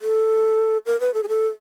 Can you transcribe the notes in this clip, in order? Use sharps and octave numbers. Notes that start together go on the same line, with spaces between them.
A4
A#4
B4
A4
G#4
A4